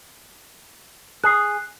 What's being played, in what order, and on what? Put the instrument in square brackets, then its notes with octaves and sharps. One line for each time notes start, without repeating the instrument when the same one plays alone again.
[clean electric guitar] G#4 [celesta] F#6 C7